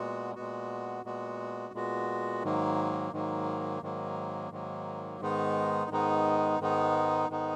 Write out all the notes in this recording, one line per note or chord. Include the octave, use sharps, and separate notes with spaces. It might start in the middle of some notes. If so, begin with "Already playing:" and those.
Already playing: A#2 G#3 B3 F#4
A#2 G#3 B3 F#4
A#2 G#3 B3 F#4
A#2 G#3 B3 F#4
G#2 D#3 F#3 A#3
G#2 D#3 F#3 A#3
G#2 D#3 F#3 A#3
G#2 D#3 F#3 A#3
G#2 D#3 G#3 B3 D#4
G#2 D#3 G#3 B3 D#4
G#2 D#3 G#3 B3 D#4
G#2 D#3 G#3 B3 D#4